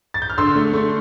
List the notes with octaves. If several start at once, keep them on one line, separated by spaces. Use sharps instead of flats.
A6
G6
F6
D3 C6 E6
A3
A3